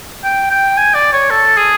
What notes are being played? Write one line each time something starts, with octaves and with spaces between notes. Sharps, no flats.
G5
G5
G#5
D5
C#5
A4
G#4